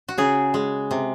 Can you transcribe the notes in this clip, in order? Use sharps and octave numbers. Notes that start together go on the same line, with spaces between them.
F#4
C#3 G#4
G#3
C3